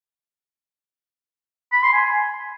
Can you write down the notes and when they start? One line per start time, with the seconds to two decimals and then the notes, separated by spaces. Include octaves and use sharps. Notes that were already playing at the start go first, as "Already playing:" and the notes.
1.72 B5
1.83 C6
1.93 G#5